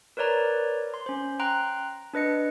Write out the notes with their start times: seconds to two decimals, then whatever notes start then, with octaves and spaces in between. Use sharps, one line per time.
0.17 A#4 B4 C#5 D5 A#5
0.94 C6
1.06 C#4 C5
1.40 G5 A#5 C6 F#6
2.13 D4 B4 D#5 C#7